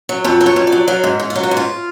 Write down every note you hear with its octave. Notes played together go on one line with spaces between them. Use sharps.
F#3
F2 A4
F#3
C#5
F2
D5
F#3
F#3 F5
G#2
G#2
F4
F#3
F#4
G#2
F4